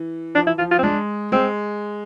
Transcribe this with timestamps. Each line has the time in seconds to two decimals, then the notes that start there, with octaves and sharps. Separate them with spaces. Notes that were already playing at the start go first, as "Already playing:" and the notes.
Already playing: E3
0.35 F3 D4
0.47 E3 E4
0.58 F3 F4
0.71 F3 F4
0.79 C4
0.83 G#3 D4
1.32 G#3 C4